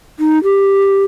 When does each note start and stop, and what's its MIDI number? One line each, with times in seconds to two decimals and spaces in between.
0.19 0.39 63
0.44 1.04 67